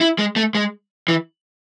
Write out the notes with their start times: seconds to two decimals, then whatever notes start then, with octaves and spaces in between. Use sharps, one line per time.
0.01 E4
0.18 G#3
0.36 A3
0.55 G#3
1.08 E3